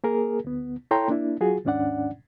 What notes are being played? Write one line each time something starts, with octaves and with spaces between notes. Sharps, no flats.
A#3 G#4 A#4
D2 B3
E4 A4 C#5 G5 A#5 C6
A#3 D4 E4
F#3 F4 F#4 G#4
D#2 G#2 C#4 D4 D5 F#5